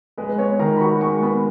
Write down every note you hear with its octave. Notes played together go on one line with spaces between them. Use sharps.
G#3 B4
B4
B3 C#5
D#3 A#5
B5
F#4 C#6
G#3 C#6
B3 B5